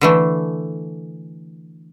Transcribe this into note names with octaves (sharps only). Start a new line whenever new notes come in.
D3 E3 A3